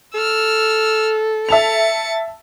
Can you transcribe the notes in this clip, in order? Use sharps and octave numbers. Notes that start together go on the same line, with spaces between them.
A4 E6 F6
E5 A5 A6 C#7 F7